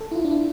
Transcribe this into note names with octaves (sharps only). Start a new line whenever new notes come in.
A4
E4
F4
D4
E4